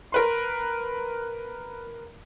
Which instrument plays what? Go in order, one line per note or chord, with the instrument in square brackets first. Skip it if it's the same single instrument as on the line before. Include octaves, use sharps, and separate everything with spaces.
[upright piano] A#4 B4 C6